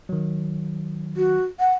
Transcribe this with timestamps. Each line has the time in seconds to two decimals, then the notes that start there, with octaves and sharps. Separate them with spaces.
0.09 D#3 F#3
1.17 F#4
1.60 F#5